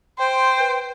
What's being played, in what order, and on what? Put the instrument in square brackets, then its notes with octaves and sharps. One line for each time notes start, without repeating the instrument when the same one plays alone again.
[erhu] C5 [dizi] G5 [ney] C6
[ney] B4